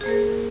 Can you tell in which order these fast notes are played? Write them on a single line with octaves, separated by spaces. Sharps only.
G#4 C5 A#3 A#4